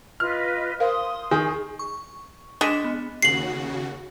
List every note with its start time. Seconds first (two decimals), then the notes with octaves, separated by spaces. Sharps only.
0.20 F4 B4 D#5 F6
0.80 A#4 C5 F5 C6 D#6
1.31 D#3 G#4
1.79 C#6
2.61 G#3 D4 B6 E7
2.84 B3
3.22 D#2 C#3 F#4 C7 F#7